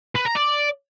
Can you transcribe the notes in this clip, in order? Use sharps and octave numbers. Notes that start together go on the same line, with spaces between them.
B4
A#5
D5